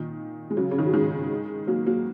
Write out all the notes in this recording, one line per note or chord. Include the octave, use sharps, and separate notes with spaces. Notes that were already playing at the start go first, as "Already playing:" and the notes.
Already playing: A#2 D#3
G#3
C#3 F#3
C#3
D#3
F#3
D#3 G#3
F#3 A#3
F#3 A#3